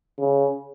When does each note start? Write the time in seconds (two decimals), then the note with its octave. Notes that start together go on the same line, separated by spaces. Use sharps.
0.20 C#3